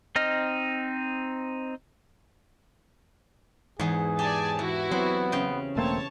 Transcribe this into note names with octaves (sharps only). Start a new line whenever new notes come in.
C4 D#4 D#5 F6
E2 G#2 E3 G#4
G4 D5 G#5 A5
E3 E4 F#4
F#3 B3 C4
C#3 G5
E1 A3 A#3 C4 C#5 A5